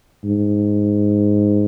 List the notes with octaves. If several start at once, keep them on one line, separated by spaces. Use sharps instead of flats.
G#2